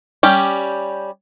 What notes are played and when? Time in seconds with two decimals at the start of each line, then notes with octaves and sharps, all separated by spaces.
0.23 G3 C#4 G4